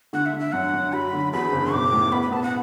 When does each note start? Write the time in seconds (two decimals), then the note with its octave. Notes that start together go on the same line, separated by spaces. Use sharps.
0.13 D3 F#5
0.26 E5
0.33 D3
0.40 E5
0.52 F#2 F#5
0.73 F#2
0.93 F#4 B5
1.13 D3
1.33 E2 B5
1.52 F#1
1.73 B1 D6
1.92 A2
2.12 B3 B5
2.23 B5
2.32 B3 A5
2.43 F#5